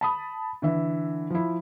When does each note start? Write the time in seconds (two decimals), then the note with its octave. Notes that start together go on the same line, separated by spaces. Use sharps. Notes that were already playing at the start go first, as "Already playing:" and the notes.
0.01 A5 B5 D#6
0.62 D3 E3 E5
1.30 F3 E4